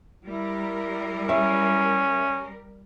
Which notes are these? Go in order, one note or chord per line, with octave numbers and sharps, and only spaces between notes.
G3 E4 A#4
C#4 E5